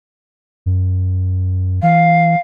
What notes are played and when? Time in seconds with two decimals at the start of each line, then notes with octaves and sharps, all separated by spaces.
0.66 F#2
1.83 E3 F5